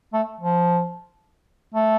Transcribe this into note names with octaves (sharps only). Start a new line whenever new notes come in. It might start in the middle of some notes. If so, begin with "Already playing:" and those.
A3
F3
A3